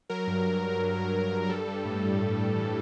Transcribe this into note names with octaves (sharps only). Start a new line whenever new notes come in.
F#3 A#4
G2
F#3
G2
G2
G2
G2
G2
G3 A4
G3
A2
G3
A2
A2
E3